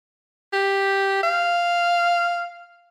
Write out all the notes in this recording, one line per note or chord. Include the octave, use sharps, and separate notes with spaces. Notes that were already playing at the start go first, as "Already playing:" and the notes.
G4
F5